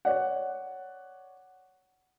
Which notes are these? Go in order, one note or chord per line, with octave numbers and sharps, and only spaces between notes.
C#5 D5 F#5